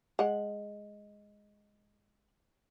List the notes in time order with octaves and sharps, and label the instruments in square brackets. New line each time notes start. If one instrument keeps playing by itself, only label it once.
[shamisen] G#3 F#5